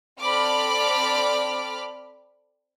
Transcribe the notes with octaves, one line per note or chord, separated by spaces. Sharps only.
C4 A4 D5 B5 D6 F6